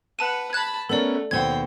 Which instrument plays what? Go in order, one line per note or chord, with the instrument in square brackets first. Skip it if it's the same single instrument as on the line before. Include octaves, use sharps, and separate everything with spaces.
[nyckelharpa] B4 F#5 [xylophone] A5 D#7
[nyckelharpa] A5 B5 [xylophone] F#6 G#6
[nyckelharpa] A3 [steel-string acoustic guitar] B3 C#4 A#4 [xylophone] A4 D5
[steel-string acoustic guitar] D#2 B2 F#5 [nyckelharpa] C4 G5 [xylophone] G#6